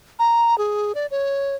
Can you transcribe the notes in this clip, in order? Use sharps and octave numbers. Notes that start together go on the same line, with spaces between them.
A#5
G#4
D5
C#5